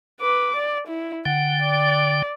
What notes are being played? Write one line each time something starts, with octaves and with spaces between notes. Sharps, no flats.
B4 D6
D5
E4
D3 F#5 G5
D5